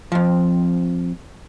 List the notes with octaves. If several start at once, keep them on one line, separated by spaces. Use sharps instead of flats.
F2 F3